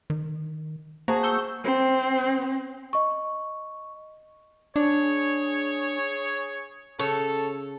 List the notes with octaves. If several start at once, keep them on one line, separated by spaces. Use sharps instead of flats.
D#3
A#3 F#4 G#4 C5 A5 A#5
C#6 E6 G6
C4
D#5 C#6
D4 G#4 C#5
C#3 A4 C#5